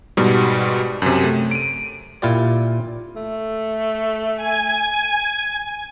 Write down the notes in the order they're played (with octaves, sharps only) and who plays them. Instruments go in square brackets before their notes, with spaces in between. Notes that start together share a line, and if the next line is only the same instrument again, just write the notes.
[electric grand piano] G#2 B2 G3
F#2 C3
A3
D7 D#7
[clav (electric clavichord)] A#2 E4 F4 G4 D5
[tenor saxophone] A3
[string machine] G#5